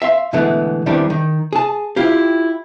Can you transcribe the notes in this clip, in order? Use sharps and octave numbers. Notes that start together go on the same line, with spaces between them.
E5 F5 C6
B2 D3 E3 G#3 A3 B3
E2 D#3 E3 G3 C4 D4
D#3
G#4 A5
E4 F4 G4